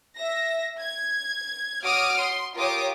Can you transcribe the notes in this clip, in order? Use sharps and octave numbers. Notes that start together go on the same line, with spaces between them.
E5 A#6
G#6
F#4 C#5 D6 D#6 F6 D7
C6
F4 G4 A#4 C#5 D6 D#6